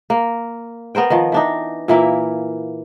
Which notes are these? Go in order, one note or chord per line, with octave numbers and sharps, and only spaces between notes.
A#3
B3 A#4 C5 G5
D#3 F3
E3 D4 D#4
A#2 E3 A#3 E4